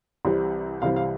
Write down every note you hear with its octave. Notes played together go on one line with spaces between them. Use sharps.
C2 C3 E3 G3 C4
C2 C3 E3 G3 C4 F5
F5